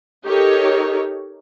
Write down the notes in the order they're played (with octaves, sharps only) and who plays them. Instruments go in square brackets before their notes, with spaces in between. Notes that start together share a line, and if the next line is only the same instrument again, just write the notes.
[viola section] D#4 G4 A4 A#4 C#5